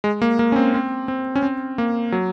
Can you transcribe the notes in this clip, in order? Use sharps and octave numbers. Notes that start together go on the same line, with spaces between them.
G#3
A#3
A#3
C#4
C4
C4
C4
C#4
C4
A#3
F#3